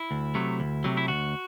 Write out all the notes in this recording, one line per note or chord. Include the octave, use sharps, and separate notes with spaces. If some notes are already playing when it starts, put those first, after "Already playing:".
Already playing: E4
D2
C3 F#3 A3
D2
C3 F#3 A3
E4
D2 F#4